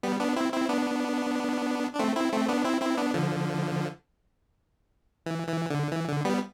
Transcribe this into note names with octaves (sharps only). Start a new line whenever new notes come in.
G3 B3
B3 D4
C4 E4
C4 E4
B3 D4
D4
A3 C4
C4 E4
A3 C4
B3 D4
C4 E4
C4 E4
B3 D4
D3 F3
E3
E3
D3
E3
D3
G3 B3